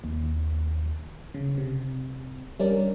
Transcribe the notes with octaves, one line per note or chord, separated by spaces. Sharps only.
D#2
C#3
C3
G3 C#4 D4 A#4 D5